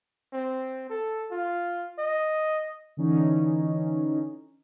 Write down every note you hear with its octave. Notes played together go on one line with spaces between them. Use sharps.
C4
A4
F4
D#5
D3 E3 C#4 D#4